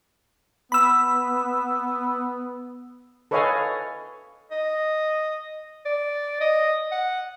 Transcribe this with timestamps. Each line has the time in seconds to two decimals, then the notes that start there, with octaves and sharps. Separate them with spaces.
0.72 B3 B5 E6
3.31 A4 B4 C#5 D#5 F5 G#5
4.51 D#5
5.86 D5
6.41 D#5
6.91 F#5